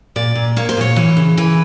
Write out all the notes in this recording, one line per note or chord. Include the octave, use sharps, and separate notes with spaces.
A#2 D5
A#2
A#3 C#5
C5
A#2 C#5
E3
C#3
E3 B4